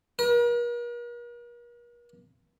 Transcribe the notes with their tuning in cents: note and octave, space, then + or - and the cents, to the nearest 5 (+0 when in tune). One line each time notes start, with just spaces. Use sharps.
A#4 +45